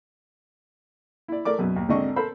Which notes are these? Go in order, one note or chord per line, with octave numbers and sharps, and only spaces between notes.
E4 D5
A3 A#4 D5 D6
F#2 B2
D#2
G#1 D3 C4 D4 D#5 C#6
A4 A#4 C5 B5